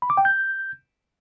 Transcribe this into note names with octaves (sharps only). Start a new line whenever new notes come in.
B5
D6
G5
G6